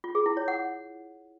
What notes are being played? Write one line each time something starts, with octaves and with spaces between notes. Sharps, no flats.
F4
G#4
E4
C#5
F#5